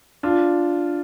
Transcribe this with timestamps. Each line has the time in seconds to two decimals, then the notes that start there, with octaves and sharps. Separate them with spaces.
0.23 D4 F4